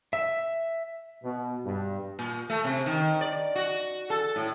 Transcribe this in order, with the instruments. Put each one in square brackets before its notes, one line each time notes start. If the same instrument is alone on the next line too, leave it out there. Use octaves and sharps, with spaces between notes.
[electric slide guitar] E5
[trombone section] B2
G2
[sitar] A#2
A3
C3
D#3
D5
F#4
A4
A2